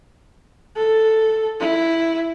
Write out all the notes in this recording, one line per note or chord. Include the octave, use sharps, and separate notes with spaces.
A4
E4